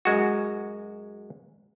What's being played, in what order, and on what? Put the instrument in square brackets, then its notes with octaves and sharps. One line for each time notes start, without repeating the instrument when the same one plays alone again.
[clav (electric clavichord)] F#2 G#3 F#4